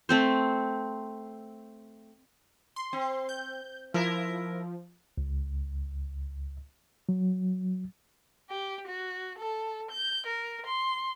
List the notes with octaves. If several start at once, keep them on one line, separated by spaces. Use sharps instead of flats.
A3 C4 C5
C6
C4
G6
F3 E4 A#4
C#2
F#3
G4
F#4
A4
G6
A#4
C6